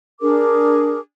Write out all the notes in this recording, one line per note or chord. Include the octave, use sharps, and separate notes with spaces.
D4 G#4 A#4 D6